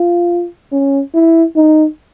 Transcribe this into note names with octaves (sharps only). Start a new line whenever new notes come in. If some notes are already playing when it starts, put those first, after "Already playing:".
Already playing: F4
C#4
E4
D#4